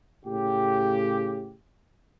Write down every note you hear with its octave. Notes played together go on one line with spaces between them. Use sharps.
A2 C#3 G4